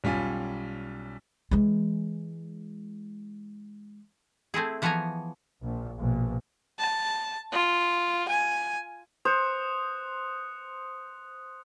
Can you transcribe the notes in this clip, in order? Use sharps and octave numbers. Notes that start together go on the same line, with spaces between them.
B1 G3 C#4 F4 G#5
E3 G#3
A3 C4 E4 G#4
E3 F3 B3 C#5 G#5 A#5
A#1
A#1 B2
A5
F4
G#5
C5 D#6 F#6 C#7